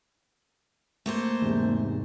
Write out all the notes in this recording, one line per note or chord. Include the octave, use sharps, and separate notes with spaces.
A3 A#3 C5
E2 G#2 C3